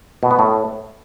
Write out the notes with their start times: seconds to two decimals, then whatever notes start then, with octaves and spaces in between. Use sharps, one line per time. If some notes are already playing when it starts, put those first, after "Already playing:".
0.23 B2
0.31 B3
0.39 A2